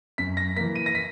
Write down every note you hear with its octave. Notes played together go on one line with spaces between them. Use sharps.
F#2 B6
A#6
E3 A#3 B6
D#7
A#6
B6